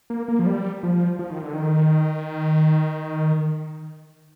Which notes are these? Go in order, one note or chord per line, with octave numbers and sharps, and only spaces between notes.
A#3
A#3
F3
G3
F3
F3
D#3
D3
D#3